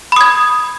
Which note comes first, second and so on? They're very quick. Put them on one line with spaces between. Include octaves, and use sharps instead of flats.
B5 D#6 G#6